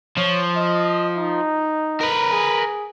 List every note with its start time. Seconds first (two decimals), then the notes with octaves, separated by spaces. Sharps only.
0.17 F3 C#5
0.56 D#5
1.17 D#4
2.01 A#4 B4
2.32 G#4